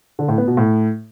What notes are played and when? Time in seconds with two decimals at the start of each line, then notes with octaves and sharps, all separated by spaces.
0.19 D3
0.28 A2
0.38 B3
0.48 B2
0.57 A2